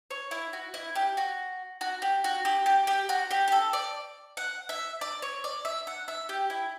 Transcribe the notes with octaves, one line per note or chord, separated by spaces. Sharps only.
C#5
E4
F#4
E4
G4
F#4
F#4
G4
F#4
G4
G4
G4
F#4
G4
G4
A4
D5
F#5
E5
D5
C#5
D5
E5
F#5
E5
G4
E4